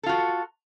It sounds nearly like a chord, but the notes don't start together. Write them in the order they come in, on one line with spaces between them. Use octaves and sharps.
A4 F4 F#4